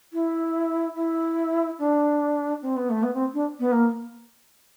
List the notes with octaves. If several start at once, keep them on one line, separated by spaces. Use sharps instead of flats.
E4
E4
D4
C4
B3
A3
B3
C4
D4
B3
A#3